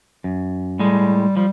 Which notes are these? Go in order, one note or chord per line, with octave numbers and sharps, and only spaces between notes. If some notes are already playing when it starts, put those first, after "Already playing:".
F#2
A2 G3 G#3
F3 G3